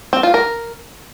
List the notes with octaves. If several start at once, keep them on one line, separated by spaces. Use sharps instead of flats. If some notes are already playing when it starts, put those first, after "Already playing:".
C4
F4
A#4